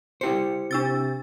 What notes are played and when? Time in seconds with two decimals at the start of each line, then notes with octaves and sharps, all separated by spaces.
0.21 E4 G4 C5 C#7
0.71 C3 D4 E6 A6